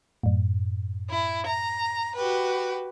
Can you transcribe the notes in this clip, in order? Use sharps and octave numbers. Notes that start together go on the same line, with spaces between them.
F#2 A2
E4
A#5
F#4 G4 B4